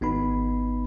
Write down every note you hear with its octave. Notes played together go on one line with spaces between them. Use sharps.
G#1 B3 D#4 B5